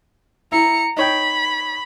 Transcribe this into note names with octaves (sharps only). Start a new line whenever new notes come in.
E4 A#5 C#7
D#4 C#5 G5 B5